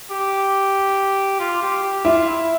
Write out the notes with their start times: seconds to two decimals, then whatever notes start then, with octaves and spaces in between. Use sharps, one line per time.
0.10 G4
1.40 F4
1.62 G4
1.83 G4
2.05 E4 F4
2.27 E4